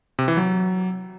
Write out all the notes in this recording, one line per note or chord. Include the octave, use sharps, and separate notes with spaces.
C3
E3
F#3